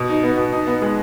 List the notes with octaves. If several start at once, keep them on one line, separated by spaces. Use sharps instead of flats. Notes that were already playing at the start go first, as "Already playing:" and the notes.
Already playing: B2
D#4
B3
B2
D#4
B3
G#3